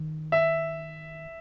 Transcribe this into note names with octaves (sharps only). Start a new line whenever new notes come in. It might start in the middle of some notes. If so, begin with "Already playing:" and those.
Already playing: D#3
E5